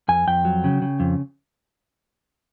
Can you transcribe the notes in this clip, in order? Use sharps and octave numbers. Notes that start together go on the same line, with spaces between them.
F2 G#5
F2 G5
F#3
C#3
C#3
F2